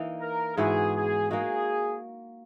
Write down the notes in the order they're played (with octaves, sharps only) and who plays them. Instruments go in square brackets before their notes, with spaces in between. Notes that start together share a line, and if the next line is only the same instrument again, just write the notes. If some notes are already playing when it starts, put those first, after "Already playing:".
Already playing: [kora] E3 A#3 D#4
[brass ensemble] A#4
[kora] G#2 E3 B3 F#4 [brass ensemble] G#4
[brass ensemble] G#4
[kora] A#3 D#4 F#4 [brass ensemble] G#4